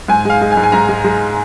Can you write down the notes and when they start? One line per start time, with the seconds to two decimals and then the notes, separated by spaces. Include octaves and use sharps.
0.08 G#2 G#5
0.25 G#3 F5
0.41 G#3
0.52 G#5
0.57 G#2
0.63 G#5
0.72 G#2 A#5
0.89 G#3
1.04 G#3